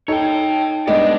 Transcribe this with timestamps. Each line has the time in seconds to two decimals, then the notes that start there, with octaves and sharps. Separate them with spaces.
0.08 D#4 A4 C#5 G5
0.87 G3 G#3 B3 D4 D5 D#5